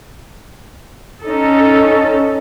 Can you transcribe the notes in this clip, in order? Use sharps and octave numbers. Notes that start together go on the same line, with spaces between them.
C#4 D#4 A4